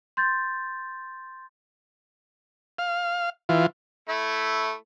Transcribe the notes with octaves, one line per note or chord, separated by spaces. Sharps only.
C6 G6 A6
F5
E3 F4
A3 E4